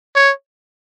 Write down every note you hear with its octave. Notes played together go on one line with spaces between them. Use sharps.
C#5